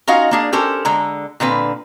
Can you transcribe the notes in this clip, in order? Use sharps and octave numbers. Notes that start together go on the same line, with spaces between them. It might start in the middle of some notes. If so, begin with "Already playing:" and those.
C#4 D#4 F4 F#4 D#5 F5
A#3 D4 G#4
C#4 G4 A4 A#4 C5
D3 G#3 A#5
A#2 D3 C4 B4